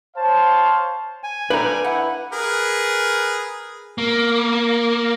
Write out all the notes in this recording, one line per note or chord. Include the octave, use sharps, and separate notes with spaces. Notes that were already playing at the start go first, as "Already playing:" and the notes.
C5 C#5 F5 A5
G#5
G3 A3 D4 B4 A#5
E4 F#5
G#4 A#4 B4
A#3